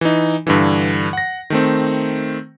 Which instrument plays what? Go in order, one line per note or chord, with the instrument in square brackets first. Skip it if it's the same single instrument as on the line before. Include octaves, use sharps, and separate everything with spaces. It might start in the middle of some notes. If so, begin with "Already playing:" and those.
[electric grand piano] E3 D#4
G2 D3 E3
F#5 A#6
D#3 A3 C4